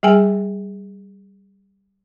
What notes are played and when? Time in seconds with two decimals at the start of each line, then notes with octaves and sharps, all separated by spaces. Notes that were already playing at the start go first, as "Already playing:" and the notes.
0.03 G3 G#4 G5 G#5